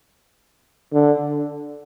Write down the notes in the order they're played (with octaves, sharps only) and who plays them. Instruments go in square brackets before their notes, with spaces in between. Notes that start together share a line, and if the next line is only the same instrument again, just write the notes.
[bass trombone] D3